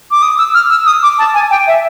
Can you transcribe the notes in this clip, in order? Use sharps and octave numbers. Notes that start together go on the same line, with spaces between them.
D6
D#6
E6
F6
E6
D#6
D6
A5
G#5
G5
E5